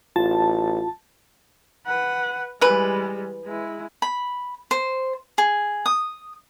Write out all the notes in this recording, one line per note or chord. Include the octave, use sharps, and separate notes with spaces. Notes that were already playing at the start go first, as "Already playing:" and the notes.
A1 F4 A5
B4 F#5
E3 G3 G#3 B4
G#3 E4
B5
C5
G#4
D#6